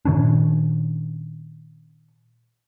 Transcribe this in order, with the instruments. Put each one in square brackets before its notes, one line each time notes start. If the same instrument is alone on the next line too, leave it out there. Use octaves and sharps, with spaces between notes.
[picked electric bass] A#2 D#3 C#4 D4